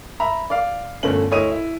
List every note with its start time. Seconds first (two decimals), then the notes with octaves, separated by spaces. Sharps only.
0.20 E5 A#5 B5
0.50 D5 F5
1.03 G1 A#2 D3 A3 C#4 F#7
1.31 D2 E4 C#5 D#5 D#6 D#7
1.51 E4